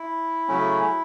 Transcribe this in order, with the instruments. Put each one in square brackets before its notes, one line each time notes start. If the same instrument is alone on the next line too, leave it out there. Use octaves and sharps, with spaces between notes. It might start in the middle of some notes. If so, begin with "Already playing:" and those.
Already playing: [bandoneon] E4
C#3 F#3 A3 C#4